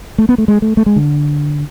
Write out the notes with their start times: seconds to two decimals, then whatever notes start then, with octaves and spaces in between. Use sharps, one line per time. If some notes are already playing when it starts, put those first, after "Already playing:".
0.18 A3
0.29 B3
0.38 A3
0.48 G#3
0.62 A3
0.77 A3
0.86 G#3
0.96 D3